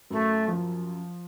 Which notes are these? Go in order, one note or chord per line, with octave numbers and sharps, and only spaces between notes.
F#2 A3
F3